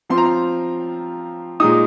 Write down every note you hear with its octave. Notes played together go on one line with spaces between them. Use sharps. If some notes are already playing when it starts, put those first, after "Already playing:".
F3 C4 F4 C6
A#5
C6
A#2 G#3 D#4 D#6